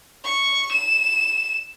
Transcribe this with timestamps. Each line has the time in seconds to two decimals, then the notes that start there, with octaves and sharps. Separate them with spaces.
0.24 C#6
0.72 E7